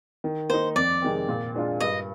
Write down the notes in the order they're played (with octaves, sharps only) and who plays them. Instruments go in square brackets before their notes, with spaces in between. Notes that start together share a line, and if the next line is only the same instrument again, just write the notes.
[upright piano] D#3
[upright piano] A#3 D#4 [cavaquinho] C5
[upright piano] F2 [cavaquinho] D5
[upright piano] C3 D#3 G#3 C4
A#2
G#3 D4 F4
[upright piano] G2 [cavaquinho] D#5